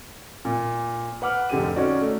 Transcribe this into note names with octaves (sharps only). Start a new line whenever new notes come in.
A#2
B4 F#5 D6 F6
F1 D3 G4 G#4 D#7
C#4 D#4 F#4 D5
A3